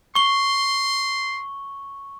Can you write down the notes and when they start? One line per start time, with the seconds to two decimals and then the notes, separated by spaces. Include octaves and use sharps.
0.15 C6 C#6 G7